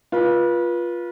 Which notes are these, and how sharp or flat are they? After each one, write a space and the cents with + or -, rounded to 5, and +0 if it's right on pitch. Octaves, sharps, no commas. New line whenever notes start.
F4 +0 B4 -30